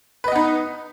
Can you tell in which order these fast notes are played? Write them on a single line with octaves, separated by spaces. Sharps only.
B4 D#5 B3 D#4